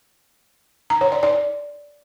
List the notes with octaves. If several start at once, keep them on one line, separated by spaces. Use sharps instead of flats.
A#5
C#5
D5
D5